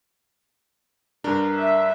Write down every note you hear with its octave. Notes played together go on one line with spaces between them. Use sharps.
G2 D4 A#4
E5